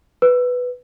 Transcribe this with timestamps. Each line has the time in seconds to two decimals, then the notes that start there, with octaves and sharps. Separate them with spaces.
0.22 B4